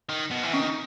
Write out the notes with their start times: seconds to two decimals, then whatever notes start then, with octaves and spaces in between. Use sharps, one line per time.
0.09 D#3
0.31 B2
0.43 E3
0.53 D#3 C#4
0.63 D#4